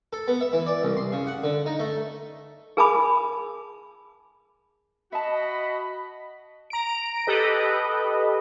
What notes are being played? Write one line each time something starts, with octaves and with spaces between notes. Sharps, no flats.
A4
B3
E5
E3
D5
C2
C6
C#3
F#5
D3
D#4
A3
G#4 A#4 G#5 A5 B5 D6
F#4 D#5 E5 A5 B5
A#5 D7
G4 A4 B4 D#5